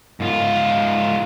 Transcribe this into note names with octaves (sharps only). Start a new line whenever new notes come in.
G#2 F4